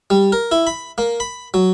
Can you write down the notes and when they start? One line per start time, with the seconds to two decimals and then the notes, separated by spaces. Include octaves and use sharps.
0.10 G3
0.32 A#4
0.52 E4
0.67 B5
0.98 A#3
1.20 B5
1.54 F#3